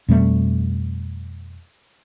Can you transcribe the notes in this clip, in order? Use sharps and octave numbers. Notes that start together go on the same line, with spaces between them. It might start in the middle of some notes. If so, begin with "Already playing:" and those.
F2 B2 G3 A3